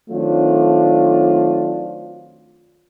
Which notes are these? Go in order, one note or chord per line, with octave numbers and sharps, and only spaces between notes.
D#3 F#3 A3 C4 D4 F4